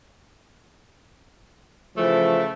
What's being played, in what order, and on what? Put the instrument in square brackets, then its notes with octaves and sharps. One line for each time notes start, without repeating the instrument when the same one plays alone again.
[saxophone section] C#3 E3 A3 [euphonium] F3